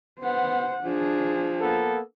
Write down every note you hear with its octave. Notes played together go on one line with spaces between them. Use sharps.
B3 C5 F#5
F3 D4 G#4
A#3 B3 A4